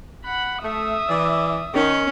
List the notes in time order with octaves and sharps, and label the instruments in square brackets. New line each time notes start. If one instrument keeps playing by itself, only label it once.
[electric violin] F#5 B5
[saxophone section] A3 [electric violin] E5 D#6
[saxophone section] E3 D5
[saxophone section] D#3 [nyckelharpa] C#4